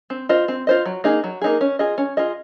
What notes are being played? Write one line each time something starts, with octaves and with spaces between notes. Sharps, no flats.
C4
F4 C5 D#5
C4
F4 C5 D#5
F#3
A#3 D#4 G#4
F#3
A#3 D#4 G#4
C#4
F4 G#4 D#5
C#4
F4 G#4 D#5